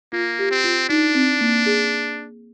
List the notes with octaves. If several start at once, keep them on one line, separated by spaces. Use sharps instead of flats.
A#3 F4
G4
C4
F4
D4 D#4
C4
A#3
G#4